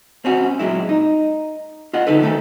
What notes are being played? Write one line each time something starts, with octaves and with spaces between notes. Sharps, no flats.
C4 C#4 F#4
A#2 F#3 G#3 E4
D#4
F4 D#5 F#5
D3 D#4 A4 B4
D#3 A3 A4